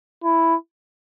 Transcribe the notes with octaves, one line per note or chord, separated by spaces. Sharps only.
E4